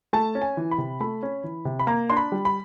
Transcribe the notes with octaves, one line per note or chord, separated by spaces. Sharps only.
A3 A5
C#4
G#5
E3
B5
C3
A3 B5
C#4
E3
C3
B5
A#3 A#5
D4 C6
B5
G3
B5